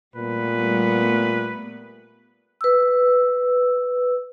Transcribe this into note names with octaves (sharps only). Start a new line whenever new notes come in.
A#2 G3 A3 B3 B4
B4 E6